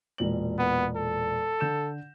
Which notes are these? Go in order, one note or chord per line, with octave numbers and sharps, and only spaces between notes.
E1 A#2 F#7
B3
A4
D3 G6 E7